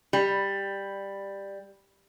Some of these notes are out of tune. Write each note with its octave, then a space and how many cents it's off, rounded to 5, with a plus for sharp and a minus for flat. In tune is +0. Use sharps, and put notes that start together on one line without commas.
G3 +10